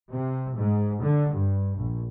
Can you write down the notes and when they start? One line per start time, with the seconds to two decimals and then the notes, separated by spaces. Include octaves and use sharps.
0.11 C3
0.55 G#2
1.02 D3
1.35 G2
1.76 A#1